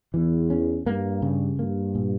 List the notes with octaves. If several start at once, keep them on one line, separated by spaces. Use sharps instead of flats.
E2 E3
C#4
G2 A#3
C#3
G2 A#3
A#2